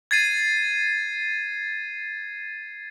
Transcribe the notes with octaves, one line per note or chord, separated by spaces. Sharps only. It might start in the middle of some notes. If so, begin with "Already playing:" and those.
G#6 A6 C7 D#7